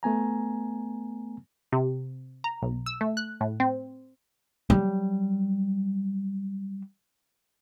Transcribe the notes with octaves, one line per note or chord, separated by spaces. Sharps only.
A3 B3 G#5 A#5
C3
A#5
B1
E6
A3
F#6
A2
C4
F#3 G3